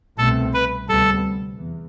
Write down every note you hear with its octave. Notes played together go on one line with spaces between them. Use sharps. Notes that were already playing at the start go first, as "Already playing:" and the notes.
C2 B2 A3 C4 A4
B4
D2 C3 G3 B3 A4
E2